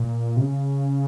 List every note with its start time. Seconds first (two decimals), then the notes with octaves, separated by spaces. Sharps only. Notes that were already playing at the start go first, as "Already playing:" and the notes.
Already playing: A#2
0.37 C3
0.41 C#3